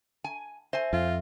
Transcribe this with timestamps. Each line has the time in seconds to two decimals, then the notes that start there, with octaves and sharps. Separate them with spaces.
0.24 G#5
0.73 C5 E5 G#5
0.93 F2 F4